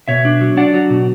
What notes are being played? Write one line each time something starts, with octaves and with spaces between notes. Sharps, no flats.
B2 C#5 E5
D4
F#3
D4 D5 F#5
F#3
B2